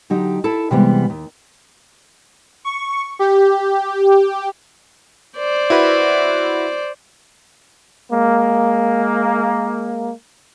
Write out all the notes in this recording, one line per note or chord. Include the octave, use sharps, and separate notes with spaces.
D3 F#3 D#4 G4
E4 A4 A5
C3 E3 G3 G#3 B3
D#2
C#6
G4
C5 D5
E4 F#4 B4
G#3 A#3